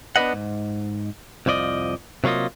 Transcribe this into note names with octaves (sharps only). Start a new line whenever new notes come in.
B3 D4 D#4 B4 D#5 F#5
G#2
C2 F2 F3 D5 D#5
C3 F#3 A#3 F4 D#5